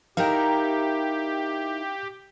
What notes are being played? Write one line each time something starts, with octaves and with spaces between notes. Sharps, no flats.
D#4 E4 G4 A#4 F5 G5